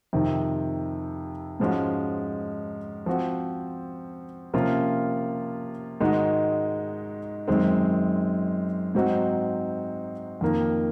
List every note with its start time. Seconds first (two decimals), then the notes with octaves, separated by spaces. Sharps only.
0.13 F2 C3 D#3
1.60 G#2 F3 G#3 C#4 F#4
3.06 F3 C4 F#4
4.53 C3 F3 A#3 C#4 F4
6.00 G#2 D#3 G#3 D#4 F#4
7.48 F#2 D#3 G#3 C4
8.95 G#2 F#3 C4 D#4 F#4
10.41 F2 D#3 A#3